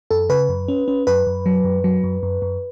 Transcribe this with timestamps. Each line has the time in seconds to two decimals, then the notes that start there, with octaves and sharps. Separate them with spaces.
0.11 F#2 A4
0.29 C#3 B4
0.49 F#2
0.68 C#4
0.88 C#4
1.07 F#2 B4
1.27 F#2
1.46 F#3
1.64 F#2
1.84 F#3
2.04 F#2
2.23 F#2
2.42 F#2